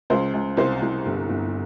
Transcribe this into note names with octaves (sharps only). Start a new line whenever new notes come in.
C#2 C5
C#2
C2 C5
C2
G1
G1